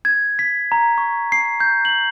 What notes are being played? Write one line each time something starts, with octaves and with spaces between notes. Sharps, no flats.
G#6
B6
A#5
C#6
C7
G6
F#7